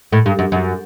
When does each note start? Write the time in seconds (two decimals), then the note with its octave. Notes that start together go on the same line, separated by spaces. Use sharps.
0.12 A2
0.26 G2
0.39 F#2
0.52 F#2